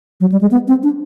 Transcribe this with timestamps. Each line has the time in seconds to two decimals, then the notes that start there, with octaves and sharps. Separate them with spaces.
0.21 F#3
0.32 G3
0.41 G#3
0.51 B3
0.68 C4
0.83 D4